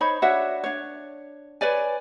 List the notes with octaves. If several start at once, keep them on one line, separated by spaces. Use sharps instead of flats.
D#4 C5 C#5 B5
D4 F#4 C#5 E5
D4 C#5
B4 C#5 D5 G#5